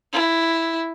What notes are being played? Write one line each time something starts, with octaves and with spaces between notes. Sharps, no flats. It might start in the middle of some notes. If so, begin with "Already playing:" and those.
E4